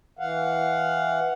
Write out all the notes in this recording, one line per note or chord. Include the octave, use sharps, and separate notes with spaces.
E3 F5 F#5